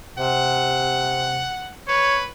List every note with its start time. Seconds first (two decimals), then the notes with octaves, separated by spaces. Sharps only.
0.18 C3 F#5
1.88 B4 C#5